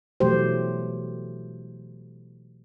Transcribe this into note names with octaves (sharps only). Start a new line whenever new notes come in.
B2 E3 F#3 A3 G4 C5